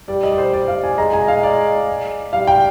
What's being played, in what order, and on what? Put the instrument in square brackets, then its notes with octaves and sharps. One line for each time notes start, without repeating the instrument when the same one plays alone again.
[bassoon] G3 [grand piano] D5
[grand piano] D#5
D5
C5
D5
F5
G#5
[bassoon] G#3 [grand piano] A#5
[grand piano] G#5
F5
D5
[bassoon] G3 [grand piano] F5
[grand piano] G5